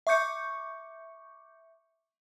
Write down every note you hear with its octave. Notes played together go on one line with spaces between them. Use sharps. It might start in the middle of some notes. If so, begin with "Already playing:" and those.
E5 C#6 D6 G6 C#7